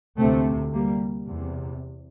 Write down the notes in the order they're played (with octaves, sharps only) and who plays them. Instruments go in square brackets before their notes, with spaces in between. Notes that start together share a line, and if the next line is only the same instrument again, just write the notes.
[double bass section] D2 C3 A3 C4
G3 A#3
E2 C3